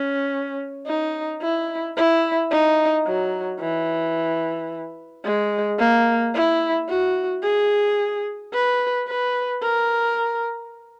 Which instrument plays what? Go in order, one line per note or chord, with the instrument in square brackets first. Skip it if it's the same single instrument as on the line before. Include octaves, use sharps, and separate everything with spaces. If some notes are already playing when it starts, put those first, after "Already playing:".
Already playing: [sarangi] C#4
D#4
E4
E4
D#4
F#3
E3
G#3
A#3
E4
F#4
G#4
B4
B4
A#4